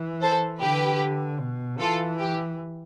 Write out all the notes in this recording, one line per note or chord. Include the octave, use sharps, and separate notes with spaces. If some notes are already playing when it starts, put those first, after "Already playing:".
Already playing: E3
A4 C5
D3 G4 B4
B2
E3 F4 A4
G4